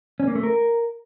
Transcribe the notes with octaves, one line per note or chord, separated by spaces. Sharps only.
C#4
A#3
A3
A#4